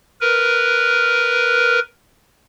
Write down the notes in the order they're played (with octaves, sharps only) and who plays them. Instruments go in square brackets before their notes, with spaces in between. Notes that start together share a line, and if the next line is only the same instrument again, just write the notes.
[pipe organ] A#4 B4